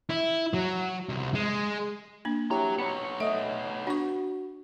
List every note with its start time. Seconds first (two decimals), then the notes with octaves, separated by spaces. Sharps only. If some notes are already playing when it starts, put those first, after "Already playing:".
0.10 E4
0.54 F#3
1.09 C2
1.34 G#3
2.25 A#3 D4
2.51 E4 F#4 G4 C#5 A#5
2.78 B3 C#5 B5 C#7
3.20 A3 D#5 E5
3.87 D4 F#4 C#6